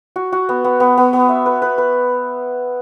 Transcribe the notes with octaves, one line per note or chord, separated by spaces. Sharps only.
F#4
F#4
B3
B3
B3
B3
B3
E5
B4
B4
B4